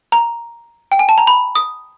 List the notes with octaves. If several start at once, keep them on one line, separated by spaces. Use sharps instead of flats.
A#5
G5
G#5
A5
A#5
B5
D#6